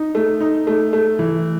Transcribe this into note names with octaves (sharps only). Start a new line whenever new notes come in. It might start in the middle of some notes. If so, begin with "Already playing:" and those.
Already playing: D#4
A3
D#4
A3
A3
E3